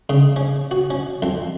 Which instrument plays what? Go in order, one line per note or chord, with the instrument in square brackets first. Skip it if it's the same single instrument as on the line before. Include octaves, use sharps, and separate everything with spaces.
[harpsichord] C#3
C#4
F#4
C#4
F2